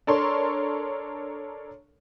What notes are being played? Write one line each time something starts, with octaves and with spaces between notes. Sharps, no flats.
D4 A4 A#4 C#5 C6